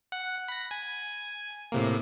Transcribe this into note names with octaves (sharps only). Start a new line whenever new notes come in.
F#5
B5 A#6
G#5
A2 C3 A#3